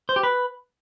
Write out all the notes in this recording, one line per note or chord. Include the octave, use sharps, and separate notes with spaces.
C5
G4
B4